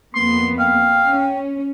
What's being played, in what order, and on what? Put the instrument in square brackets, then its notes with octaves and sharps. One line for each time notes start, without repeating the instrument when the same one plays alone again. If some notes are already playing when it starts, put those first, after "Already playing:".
[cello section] F2 A#3 B3 [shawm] C6
[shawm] F5 [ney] G5
[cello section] C#4